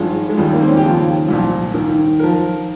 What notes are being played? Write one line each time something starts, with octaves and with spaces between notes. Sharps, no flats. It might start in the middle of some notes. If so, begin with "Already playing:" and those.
Already playing: G#1 G2 F3 G#3
G#3
D#2 D#3 G3
A#3
C4
C#4
G4
D#2 C#3 F3 F4
C2 A#2 F3
D#2 D#3 A#4
A#4
F3